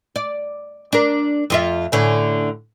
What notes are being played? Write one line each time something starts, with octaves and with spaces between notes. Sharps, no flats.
D5
D4 A#4
F2 F4 E5
A2 D3 C#4